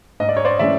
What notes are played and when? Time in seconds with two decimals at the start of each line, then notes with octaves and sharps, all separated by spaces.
0.20 G#2 D#5
0.29 D5
0.37 C#5
0.45 C5 D5
0.59 E3 G#3 C#4 D5 E5